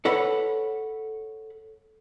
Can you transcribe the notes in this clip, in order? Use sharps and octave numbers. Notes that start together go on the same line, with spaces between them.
A4 B4 C#5 F#5 B5